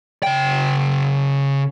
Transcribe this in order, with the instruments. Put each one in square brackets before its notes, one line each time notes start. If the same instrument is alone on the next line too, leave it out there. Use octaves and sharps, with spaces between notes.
[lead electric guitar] C#3 G5